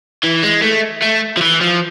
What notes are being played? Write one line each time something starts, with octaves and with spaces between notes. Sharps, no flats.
E3
G#3
A3
A3
F3
E3
F3